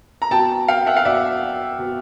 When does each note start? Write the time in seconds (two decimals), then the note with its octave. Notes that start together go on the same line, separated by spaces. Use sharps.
0.22 A#5
0.31 B2 G5 A5
0.68 F5 G5
0.86 E5 F#5
0.97 F5
1.05 B2 D5 E5
1.79 B2